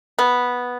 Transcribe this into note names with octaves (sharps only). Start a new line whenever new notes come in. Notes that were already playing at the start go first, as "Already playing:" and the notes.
B3